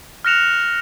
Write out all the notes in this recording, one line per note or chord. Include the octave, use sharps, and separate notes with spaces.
F6 F#6 A#6 C#7 E7 F7